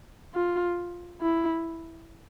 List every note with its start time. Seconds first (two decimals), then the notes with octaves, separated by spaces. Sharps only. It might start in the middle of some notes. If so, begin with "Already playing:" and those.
0.35 F4
1.21 E4